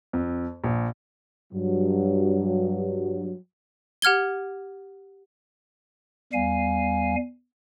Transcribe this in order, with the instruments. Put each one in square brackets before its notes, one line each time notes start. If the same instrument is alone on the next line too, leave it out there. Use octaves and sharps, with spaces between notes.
[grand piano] F2
A#1
[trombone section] G2 F#3
[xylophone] G4 F#5 F6 G#6 G7
[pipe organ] E2 G3 F5 G#5